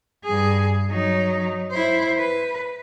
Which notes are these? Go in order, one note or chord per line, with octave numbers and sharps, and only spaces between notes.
G2 G#4
F#3 D#4
E4 C5
B4